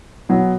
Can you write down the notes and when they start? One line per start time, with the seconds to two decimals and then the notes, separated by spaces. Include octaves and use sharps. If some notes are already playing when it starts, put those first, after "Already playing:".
0.29 B2 F#3 B3